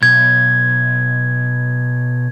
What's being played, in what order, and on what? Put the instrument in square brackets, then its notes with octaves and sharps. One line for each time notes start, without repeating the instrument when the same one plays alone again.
[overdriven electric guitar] B1 [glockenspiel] G#6